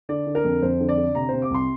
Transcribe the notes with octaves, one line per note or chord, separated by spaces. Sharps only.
D3 D5
D3
A#4
F2
F2 C5
D3
D5
D3
C3 A#5
C3 C5
D6
C2 C6